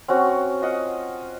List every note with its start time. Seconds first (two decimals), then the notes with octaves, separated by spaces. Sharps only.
0.08 C4 C#4 F#4
0.62 F4 D#5 F#5